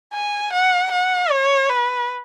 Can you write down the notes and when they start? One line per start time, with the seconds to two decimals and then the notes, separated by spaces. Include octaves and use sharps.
0.14 G#5
0.53 F#5
0.92 F#5
1.30 C#5
1.69 B4